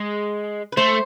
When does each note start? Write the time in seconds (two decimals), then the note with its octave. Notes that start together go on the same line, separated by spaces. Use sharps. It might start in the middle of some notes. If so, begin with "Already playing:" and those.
Already playing: G#3 G#4
0.72 B4
0.77 A3 C5